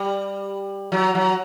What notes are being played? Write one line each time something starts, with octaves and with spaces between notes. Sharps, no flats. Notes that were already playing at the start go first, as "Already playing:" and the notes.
Already playing: G3
F#3
F#3